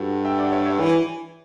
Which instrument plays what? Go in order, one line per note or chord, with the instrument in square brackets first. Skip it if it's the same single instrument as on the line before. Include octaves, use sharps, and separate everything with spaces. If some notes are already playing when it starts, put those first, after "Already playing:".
Already playing: [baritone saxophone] G2 [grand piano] F#4 A4
[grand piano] E5 G5
D5 F#5
C#5 E5
C#5 E5
[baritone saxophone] E3